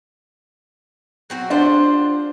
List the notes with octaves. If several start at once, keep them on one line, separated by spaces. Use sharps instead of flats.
F#3 C4 F#4
D4 F4 G4 C5